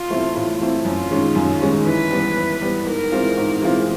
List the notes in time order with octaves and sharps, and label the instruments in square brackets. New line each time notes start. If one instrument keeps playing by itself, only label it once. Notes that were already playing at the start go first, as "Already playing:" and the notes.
Already playing: [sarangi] F4
[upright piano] E3 A3 C4 E4
A2
E3 A3 C4 E4
[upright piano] F#2 [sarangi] F4
[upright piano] D#3 G#3 C#4
F#2
D#3 G#3 C#4
[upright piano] E3 [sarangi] B4
[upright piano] G3 B3
E3
G3 B3
[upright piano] G#2 [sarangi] A#4
[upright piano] E3 G#3 C4 F4
G#2
E3 G#3 C4 F4